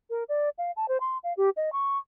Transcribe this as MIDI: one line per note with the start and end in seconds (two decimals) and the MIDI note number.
0.10 0.24 70
0.29 0.49 74
0.58 0.71 77
0.76 0.88 81
0.88 0.97 72
1.00 1.18 84
1.23 1.33 77
1.37 1.50 67
1.57 1.72 75
1.72 1.98 85